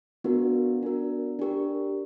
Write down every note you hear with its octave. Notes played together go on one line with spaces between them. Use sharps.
B3 D4 F#4 A#4
B3 D4 F#4 A#4
D4 G4 A#4